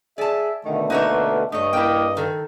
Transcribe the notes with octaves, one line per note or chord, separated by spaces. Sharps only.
G#4 D5 E5 A5
B2 D3 D#3 A3
A#3 D#4 B4 C#5 E5
G2 A3 D4 C#5 D#5
A#3 E4 G5
D#3 A4